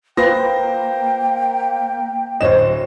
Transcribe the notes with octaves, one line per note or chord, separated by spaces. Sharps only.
A#3 F4 B4 C5 G5 A#6
D1 C5 C#5 D#5 E7